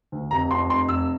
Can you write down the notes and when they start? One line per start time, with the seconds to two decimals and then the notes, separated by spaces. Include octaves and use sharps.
0.12 D2
0.31 F1 A#5
0.51 F2 C6
0.70 F1 C6
0.89 F1 E6